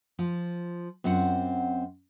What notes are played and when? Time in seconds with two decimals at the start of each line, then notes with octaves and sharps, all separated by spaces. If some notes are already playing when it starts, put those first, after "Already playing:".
0.19 F3 F4
1.04 F#2 C4 F4 F#5